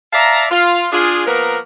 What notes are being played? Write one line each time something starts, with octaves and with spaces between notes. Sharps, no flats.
D5 E5 F5 A5 A#5
F4
D4 F4 G#4
F3 A#3 B3 A#4